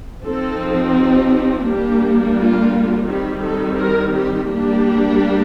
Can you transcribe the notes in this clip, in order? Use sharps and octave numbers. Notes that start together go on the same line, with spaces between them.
F3 C4 D#4 A4
G4
G3 A#3 D4 G4
F4
D#3 G3 C4 G4
A4
A#4
G4
G3 A#3 D4 G4